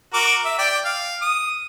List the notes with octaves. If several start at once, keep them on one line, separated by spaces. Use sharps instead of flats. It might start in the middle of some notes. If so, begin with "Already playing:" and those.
F#4 A#4 D6
E5
D5 G5
F5
D#6